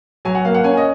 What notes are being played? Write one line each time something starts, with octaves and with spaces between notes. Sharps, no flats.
F#3 G#5
F#5
A#3 F5
F#5
C#4 G#5
D#5